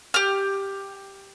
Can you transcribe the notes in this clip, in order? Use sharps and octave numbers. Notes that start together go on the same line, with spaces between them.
G4 F6